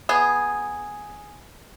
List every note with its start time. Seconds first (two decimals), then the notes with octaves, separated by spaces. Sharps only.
0.09 B3 G#4